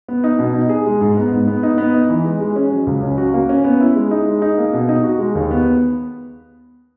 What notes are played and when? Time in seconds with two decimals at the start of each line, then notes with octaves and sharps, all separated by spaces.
0.08 B3
0.24 D#4
0.39 B2
0.54 D#4
0.69 G#4
0.86 G#3
1.01 G#2
1.17 B3
1.32 G#2
1.48 B3
1.63 D#4
1.78 B3
1.94 D#4
2.09 E3
2.25 G#3
2.40 G#3
2.56 C#4
2.71 F#3
2.87 C#2
3.03 C#4
3.18 F#4
3.34 A#3
3.49 C#4
3.64 B3
3.80 E4
3.95 G#3
4.11 D#4
4.27 G#3
4.42 D#4
4.58 A#3
4.74 B2
4.89 D#4
5.04 F#4
5.19 G#3
5.35 D#2
5.51 B3